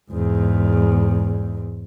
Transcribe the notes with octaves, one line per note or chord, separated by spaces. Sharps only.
E2 G#2